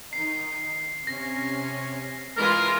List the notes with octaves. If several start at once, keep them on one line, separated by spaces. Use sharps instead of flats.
D#3 D#4 C7
C3 C#4 A#6
E3 G#3 F4 A#4